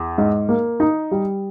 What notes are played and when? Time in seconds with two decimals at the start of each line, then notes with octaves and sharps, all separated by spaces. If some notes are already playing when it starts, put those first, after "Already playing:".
Already playing: E2
0.18 G#2
0.49 A#3
0.80 D#4
1.11 G3